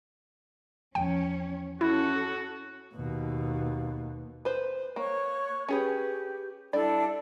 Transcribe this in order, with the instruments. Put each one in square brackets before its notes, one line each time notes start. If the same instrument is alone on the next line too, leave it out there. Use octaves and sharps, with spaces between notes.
[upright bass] E2 F3 [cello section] C#4 C#5 [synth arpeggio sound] G5
[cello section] C#4 A4 [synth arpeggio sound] E4 [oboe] F#4
[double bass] D#2 B2
[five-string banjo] B4 C5
[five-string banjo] A#3 [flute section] C#5 C#6 F#6
[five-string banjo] C#4 G#4 B4 [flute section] G4
[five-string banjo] G3 D5 [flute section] D4 E4 A4